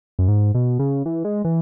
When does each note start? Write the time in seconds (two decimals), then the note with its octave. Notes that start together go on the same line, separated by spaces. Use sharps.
0.19 F#2
0.28 G#2
0.55 B2
0.79 C#3
1.06 E3
1.25 G#3
1.45 E3